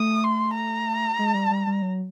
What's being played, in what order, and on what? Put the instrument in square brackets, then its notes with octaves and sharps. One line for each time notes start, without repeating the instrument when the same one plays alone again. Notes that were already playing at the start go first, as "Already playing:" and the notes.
Already playing: [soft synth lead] A3 [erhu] D#6
[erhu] C6
A#5
[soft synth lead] G#3
G3
G3
G3
F#3